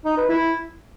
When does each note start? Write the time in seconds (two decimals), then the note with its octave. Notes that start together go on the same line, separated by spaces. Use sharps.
0.05 D#4
0.17 B4
0.29 E4